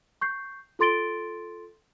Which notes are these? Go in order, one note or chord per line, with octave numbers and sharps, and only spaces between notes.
C#6 G6 C7
F4 A4 C6 A6 D7 G7